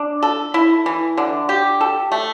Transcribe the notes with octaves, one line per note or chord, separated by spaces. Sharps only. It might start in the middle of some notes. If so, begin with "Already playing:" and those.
Already playing: D4
A4
E4
E3
D3
G4
A4
A3